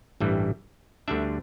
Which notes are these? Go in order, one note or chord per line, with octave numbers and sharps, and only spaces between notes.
A1 G2 E3 G3
D2 D3 G3 D4 E5